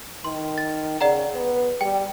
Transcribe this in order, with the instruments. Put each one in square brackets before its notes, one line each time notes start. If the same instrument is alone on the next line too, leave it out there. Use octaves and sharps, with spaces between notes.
[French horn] D#3 [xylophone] C6
[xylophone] A6
[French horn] C#3 [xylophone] D5 F#5 A#5
[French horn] B3
[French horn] G3 [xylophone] G5